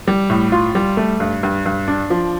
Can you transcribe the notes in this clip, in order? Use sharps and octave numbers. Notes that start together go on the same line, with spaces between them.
G3
A2
F4
G3
A3
G2
G2
G2
D4
F3